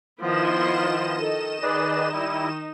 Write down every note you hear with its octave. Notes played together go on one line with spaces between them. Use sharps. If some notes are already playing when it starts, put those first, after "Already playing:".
D#3 F3 B3 E4 F4 D#5 E7
A4
D#4 G#4 B4 D5
G3 E4